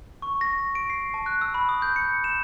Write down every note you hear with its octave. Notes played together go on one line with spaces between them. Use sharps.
C#6
A#6
D7
C7
A5
F#6
E6
B5
D#6
G6
C#7
E7